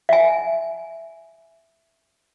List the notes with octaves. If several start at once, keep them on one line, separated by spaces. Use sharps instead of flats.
E5 G#5